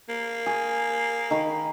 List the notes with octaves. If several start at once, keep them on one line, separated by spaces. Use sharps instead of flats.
A#3
G#4
D#3 B5